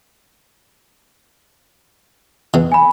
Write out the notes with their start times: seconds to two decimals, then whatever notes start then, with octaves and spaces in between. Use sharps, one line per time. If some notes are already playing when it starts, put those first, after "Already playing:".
2.54 E2 E3
2.72 G#5 B5